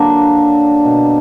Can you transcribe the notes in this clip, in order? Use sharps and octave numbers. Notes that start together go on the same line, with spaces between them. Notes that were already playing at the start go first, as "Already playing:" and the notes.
Already playing: D3 F#3 A#3 D4
F#3
B2